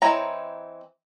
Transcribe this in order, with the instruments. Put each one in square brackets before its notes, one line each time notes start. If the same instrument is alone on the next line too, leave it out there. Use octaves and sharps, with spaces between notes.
[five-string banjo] E3 C4 D#4 C#5 A#5